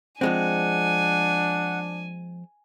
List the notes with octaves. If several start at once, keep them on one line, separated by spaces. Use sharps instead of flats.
F3 G#3 C4 D4 F#5 G#5